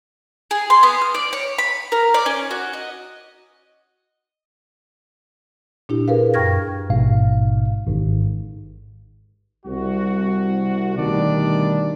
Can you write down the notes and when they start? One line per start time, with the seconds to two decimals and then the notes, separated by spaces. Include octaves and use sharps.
0.51 G#4
0.70 C6
0.83 B3
1.01 F6
1.14 D5
1.33 C#5
1.58 B5
1.92 A#4
2.14 D5
2.26 C#4
2.51 F#4
2.73 D#5
5.89 A#2 D4 E4 G4
6.08 G#4 A#4 B4 F5
6.34 F#2 G5 C#6 F6 G#6 A#6
6.90 A1 G#2 B2 F5
7.87 G#1 G#2
9.66 C2 F#4
10.98 D2 B2 D#3 G3 D4 D5